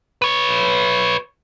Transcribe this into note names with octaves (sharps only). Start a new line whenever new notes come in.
B4 C#5